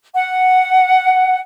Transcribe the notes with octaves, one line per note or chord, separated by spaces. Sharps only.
F#5